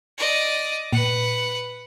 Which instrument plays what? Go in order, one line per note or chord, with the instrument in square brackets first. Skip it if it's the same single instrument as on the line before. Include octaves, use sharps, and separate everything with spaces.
[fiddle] D5 D#5
[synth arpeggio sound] A#2 [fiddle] B4 F#5